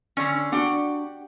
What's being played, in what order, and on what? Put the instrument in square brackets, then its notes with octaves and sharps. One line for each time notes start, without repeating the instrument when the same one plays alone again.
[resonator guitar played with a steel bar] D3 C#4 [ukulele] D5
[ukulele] D4 F#4 [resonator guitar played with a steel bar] G4 F#5